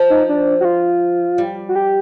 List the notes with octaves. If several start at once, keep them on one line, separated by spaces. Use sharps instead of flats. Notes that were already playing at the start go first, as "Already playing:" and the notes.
Already playing: F3
D#4
D4
F#4
F4
G3
F#4
G4